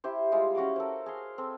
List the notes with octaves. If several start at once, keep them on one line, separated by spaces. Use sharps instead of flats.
E4 G4 C5
G3 G#3 E4 F4
C#4 F#4 F#5 D6
A4 A#4 C5
G#4 F5 C6
C4 A4